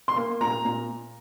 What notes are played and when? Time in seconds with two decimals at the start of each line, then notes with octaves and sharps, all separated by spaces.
0.08 C6
0.16 A#3
0.41 A#2 A#5
0.65 A#2